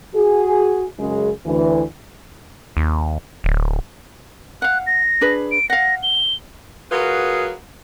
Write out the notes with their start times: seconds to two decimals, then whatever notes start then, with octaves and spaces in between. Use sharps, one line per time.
0.15 F#4 G#4
0.99 F#2 C#3 G#3 G#4
1.45 D2 E3
2.77 D#2
3.44 D1
4.62 F5 F#5 F#6
4.87 A#6
5.21 D4 G#4 B4
5.52 D7
5.70 F5 F#5 A#6
6.03 G7
6.91 F#3 F4 F#4 G#4 A#4 B4